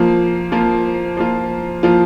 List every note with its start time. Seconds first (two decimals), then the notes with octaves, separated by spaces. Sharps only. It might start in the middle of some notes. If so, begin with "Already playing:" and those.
Already playing: F3 A#3 F4
0.52 F3 A#3 F4
1.17 F3 A#3 F4
1.83 F3 A#3 F4